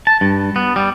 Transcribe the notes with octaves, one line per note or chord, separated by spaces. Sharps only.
A5
G2
B3
G3